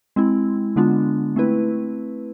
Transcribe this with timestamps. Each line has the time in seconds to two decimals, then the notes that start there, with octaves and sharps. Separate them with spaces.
0.16 G#3 C4 E4
0.76 D3 G#3 B3 D4 F4
1.36 A3 C4 E4 B4